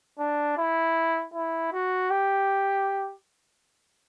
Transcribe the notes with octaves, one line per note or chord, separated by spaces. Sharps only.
D4
E4
E4
F#4
G4